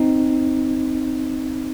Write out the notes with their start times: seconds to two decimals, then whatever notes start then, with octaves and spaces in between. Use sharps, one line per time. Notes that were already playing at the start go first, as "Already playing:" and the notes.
Already playing: C4 D#4